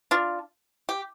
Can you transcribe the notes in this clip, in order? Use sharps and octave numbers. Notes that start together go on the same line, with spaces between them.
D4 F4
G4